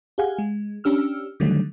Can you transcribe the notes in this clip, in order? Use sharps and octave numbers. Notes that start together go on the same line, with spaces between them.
G4 G#4 F5 F#5 G#5
G#3
C#4 D4 G4 E6 F6
D3 D#3 F#3 G3 A3